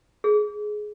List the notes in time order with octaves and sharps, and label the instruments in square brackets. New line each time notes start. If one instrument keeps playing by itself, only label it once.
[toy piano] G#4